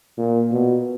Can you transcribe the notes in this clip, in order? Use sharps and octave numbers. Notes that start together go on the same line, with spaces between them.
A#2
B2